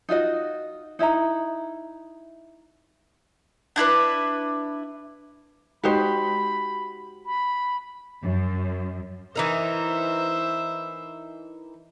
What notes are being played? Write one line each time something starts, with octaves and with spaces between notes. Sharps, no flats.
D#4 F4 F#4 D#5
D#4 E4 E5 A#5
D4 E4 A4 B4
G#3 D#4 F#4 G4 C5 B5
B5
F#2
E3 D#4 A#4 C5 E5